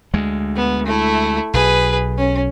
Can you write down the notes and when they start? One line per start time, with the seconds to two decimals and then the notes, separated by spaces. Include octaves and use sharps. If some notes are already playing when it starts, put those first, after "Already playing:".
0.14 D2 G#3
0.56 B3
0.86 A3 E4
1.54 B1 G#4 B4
2.18 C#4